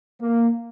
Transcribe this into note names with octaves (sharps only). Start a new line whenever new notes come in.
A#3